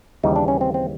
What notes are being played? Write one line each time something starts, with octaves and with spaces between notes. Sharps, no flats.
D#2 C#3 E3 G3 D#4
D4
C#4
C4
C4